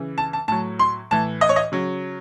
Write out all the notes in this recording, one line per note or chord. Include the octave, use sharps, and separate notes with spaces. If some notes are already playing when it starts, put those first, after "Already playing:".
Already playing: C#3 E3
A5
A5
A2 F#3 A5
C6
A2 E3 A5
D#5
C#5
D#5
C#3 F#3